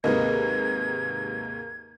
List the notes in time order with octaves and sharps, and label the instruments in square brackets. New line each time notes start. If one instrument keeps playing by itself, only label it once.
[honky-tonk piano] D#2 G#2 C3 [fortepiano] A#3 [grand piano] B4 D#5 [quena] G#6